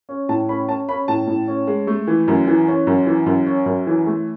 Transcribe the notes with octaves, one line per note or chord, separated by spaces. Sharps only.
C#4
A2 A5
C#4 B5
C#4 A5
C#4 B5
A2 A5
A2
C#4
G#3
A3
E3
F#2
E3
C#4
F#2
E3
F#2
C#4
F#2
E3
A3